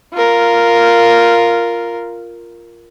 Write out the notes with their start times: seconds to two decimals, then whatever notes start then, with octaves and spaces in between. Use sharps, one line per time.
0.13 F4 A#4